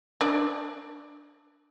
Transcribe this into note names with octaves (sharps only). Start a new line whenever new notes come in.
D4 D5